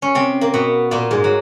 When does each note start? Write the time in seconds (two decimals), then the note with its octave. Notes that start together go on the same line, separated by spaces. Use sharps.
0.02 C#4
0.15 C3 C4
0.41 A#3
0.54 B2 B3
0.91 A#2 A#3
1.11 G#2 G#3
1.24 F#3